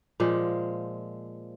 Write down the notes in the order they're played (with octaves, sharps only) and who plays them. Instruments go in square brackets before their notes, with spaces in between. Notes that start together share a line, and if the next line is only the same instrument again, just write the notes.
[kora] A#2 F3 G#3